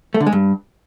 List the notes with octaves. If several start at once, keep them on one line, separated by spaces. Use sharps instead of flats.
A3
D3
G#3
G2